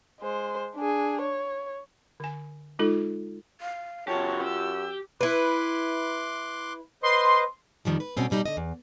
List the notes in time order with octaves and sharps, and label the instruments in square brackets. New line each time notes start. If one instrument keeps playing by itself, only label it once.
[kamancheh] G#3 C5
D4 G#4
C#5
[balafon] D3 G#5
G#3 D#4 F4 A4
[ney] F5
[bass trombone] F#2 [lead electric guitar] C#3 G4 [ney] F4 [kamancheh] C#5 A5
[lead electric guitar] G4 [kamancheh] E6
[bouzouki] E4 B4 [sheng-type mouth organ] C6 D6 F#6
[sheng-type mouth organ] B4 C5 D#5 [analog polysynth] C6
[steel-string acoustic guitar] F2 A#2 D#3 F3 G3
B4
F2 B2 G3 C4 C#4
D#2 B2 G3 D#4
D3 D#5
E2